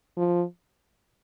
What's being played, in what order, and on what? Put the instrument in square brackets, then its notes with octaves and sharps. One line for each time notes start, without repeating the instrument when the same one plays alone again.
[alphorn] F3